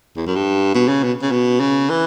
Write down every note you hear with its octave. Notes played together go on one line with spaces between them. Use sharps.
E2
F#2
G2
B2
C#3
B2
C#3
B2
C#3
E3